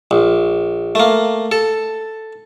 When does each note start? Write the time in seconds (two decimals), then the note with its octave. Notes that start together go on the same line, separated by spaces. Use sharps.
0.11 A#1
0.95 A3 A#3
1.52 A4